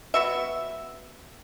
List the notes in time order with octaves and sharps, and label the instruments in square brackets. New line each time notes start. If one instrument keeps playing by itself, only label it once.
[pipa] B3 F#4 E5